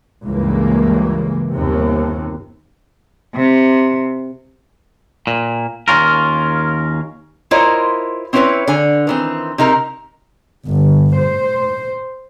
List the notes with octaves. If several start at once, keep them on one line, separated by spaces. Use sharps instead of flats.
C#2 G2 E3 A#3
G1 D#2 C3
C3
A#2
D#2 C#4 F4 A#4
E4 F4 A#4 C5 C#5 D#5
C4 C#4 E4 A#4 B4 C#5
D3 G#5
D#3 E3 C4
C3 D#4 A#4
G1
C5